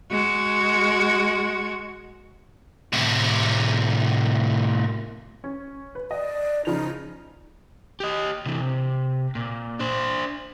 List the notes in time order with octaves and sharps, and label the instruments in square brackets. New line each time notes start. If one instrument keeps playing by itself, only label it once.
[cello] G#3 F#4
[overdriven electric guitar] A2 C3
[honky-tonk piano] C#4
B4
[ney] D5 [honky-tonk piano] D#5
[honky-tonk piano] C#3 F3 F7 [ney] D#4
[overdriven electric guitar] G4 D#5
C3 E3
C3
A#2
D4 C5